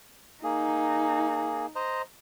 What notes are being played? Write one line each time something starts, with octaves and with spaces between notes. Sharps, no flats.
A#3 D#4 G#4
C5 D#5 A#5